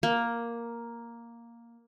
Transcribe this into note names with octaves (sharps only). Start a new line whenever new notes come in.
A#3